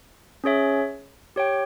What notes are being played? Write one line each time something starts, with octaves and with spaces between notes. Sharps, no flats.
C#4 G#4 C#5 E5
G4 C#5 G5